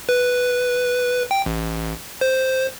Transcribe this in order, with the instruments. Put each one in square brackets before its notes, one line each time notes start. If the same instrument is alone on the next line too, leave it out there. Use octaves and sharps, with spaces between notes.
[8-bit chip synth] B4
G5
A1
C5